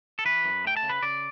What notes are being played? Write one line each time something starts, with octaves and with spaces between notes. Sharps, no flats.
A4
E3 B4
F#2
A3 G5
A5
C#3
B4
C#3 D5